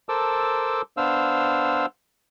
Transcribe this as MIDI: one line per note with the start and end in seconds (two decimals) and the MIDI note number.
0.09 0.82 69
0.09 0.82 70
0.09 0.82 72
0.09 0.82 81
0.09 0.82 86
0.09 0.82 88
0.97 1.86 59
0.97 1.86 62
0.97 1.86 72
0.97 1.86 77
0.97 1.86 88